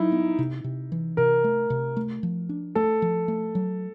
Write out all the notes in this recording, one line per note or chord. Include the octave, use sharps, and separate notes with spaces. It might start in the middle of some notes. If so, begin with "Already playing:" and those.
Already playing: F#3 D#4 E4
B3
C3
C3
E3
C3 A#4
A3
C3
A3
F3
D4
A3 A4
F3
A3
F#3